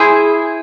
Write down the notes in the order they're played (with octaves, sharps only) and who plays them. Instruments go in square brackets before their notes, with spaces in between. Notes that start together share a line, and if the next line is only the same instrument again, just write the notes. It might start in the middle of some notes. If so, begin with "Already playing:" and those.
Already playing: [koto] E4 G#4 C5 E5